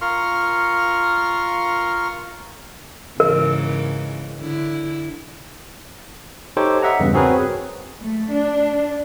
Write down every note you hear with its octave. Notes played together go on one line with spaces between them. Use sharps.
F4 A#4 C6 C#6 F6
G#2 C#3 E3 A#4
D3 E4
D#4 G4 A4 C5 C#5 D6
D#5 E5 F#5 A#5
E2 G2 C#3
C4 F#4 G#4 A#4 B4 C#5
A3
D4